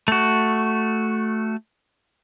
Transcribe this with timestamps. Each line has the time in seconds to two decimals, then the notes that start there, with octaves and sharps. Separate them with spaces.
0.08 A3 F#4